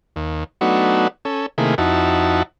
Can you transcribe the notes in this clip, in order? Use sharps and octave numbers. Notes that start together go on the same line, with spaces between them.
D#2
F#3 A3 B3 D4 D#4 F#4
C#4 A4
C3 D#3 A3 A#3 E4 G#4
F2 D#4 E4 F#4 A5